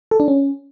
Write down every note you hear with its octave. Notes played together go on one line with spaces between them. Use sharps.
A4
D4
C#4